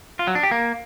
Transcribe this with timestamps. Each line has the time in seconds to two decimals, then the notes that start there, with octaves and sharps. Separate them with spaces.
0.19 F4
0.27 F#3
0.35 D4
0.43 G4
0.51 A#3